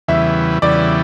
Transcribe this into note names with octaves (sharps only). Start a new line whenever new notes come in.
E2 C#3 E3 G3 B3 E5
E2 C#3 E3 G3 B3 D5